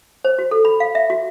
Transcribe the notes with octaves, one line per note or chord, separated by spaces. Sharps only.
C5
F#4
A4
B5
F5
E5
F#4